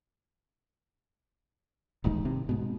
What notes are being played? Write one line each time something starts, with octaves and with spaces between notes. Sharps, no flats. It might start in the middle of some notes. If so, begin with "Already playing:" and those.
D#1 A1 G#2 D#3
C3
G#2 B2